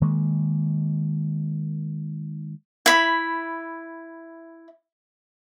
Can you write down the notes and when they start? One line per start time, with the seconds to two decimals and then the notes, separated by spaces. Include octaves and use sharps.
0.01 D#3 G#3 A#3
2.86 E4 B5